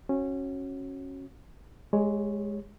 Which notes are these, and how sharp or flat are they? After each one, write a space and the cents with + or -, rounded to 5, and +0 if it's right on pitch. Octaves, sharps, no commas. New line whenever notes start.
C#4 -20 F#4 +0
G#3 +0 G4 +40 C#5 +0